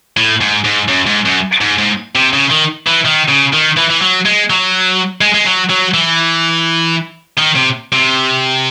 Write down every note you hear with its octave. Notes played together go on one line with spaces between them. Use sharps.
A2
G#2
G#2
F#2
G#2
F#2
G#2
G#2
C3
C#3
D#3
E3
D#3
C#3
D#3
E3
E3
F#3
G#3
F#3
G#3
G#3
F#3
F#3
E3
D#3
C3
C3